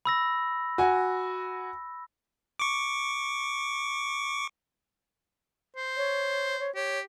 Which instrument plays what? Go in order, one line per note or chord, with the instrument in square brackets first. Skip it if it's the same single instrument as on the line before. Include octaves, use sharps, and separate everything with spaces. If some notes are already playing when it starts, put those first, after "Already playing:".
[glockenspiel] B5 E6 A#6
[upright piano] F#4 G#5
[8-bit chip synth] C#6 D6
[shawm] C5
[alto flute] C#5
C#5
[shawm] G4 [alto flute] C#5